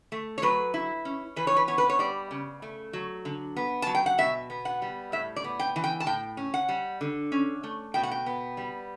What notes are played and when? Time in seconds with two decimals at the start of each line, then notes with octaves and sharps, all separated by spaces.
0.12 A3
0.38 C#5
0.42 F#3 B4
0.74 E4
1.05 C#4
1.36 E3 B4
1.47 C#5
1.56 B4
1.67 B3 C#5
1.78 B4
1.90 C#5
1.99 G3 D5
2.31 C#3
2.62 A3
2.93 F#3
3.25 D3
3.56 B3
3.82 F#3 A5
3.95 G5
4.06 F#5
4.18 B2 E5
4.50 B3
4.65 F#5
4.82 G3
5.12 A2 E5
5.36 D5
5.44 B3
5.60 G5
5.76 E3
5.84 G5
6.00 A5
6.06 A2 G5
6.37 C#4
6.54 F#5
6.69 G3
7.01 D3
7.32 C#4
7.64 A3
7.94 B2 G5
8.03 F#5
8.11 G5
8.26 B3
8.57 G3